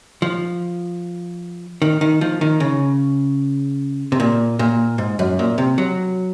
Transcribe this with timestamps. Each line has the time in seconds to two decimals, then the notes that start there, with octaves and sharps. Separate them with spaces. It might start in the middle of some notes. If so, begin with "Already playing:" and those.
0.22 F3
1.82 D#3
2.01 D#3
2.21 F3
2.41 D#3
2.60 C#3
4.12 C3
4.20 A#2
4.59 A#2
4.98 G#2
5.19 F#2
5.39 A#2
5.58 C3
5.78 F#3